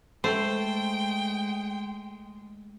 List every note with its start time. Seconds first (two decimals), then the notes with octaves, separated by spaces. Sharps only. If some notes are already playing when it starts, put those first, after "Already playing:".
0.24 G#3 A3 C5 G5